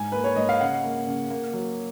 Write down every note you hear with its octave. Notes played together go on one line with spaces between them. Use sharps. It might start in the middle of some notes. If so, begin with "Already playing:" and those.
Already playing: G#2 G#5
A#3 B4
C#5
G#2 D#5
F5
C#3 F#5
A#3
C#3
A#3
F#3